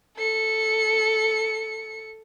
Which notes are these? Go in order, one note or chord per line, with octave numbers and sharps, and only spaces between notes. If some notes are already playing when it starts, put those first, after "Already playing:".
A4 C#7